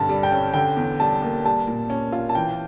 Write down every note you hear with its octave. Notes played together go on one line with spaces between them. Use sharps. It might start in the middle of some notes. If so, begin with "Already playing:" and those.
Already playing: G2 D3 A5
G3
G5
C#4
D3 G5
E2
G3 A5
A#3
G3 A5
A#2
C#4
F4
A5
E3 G5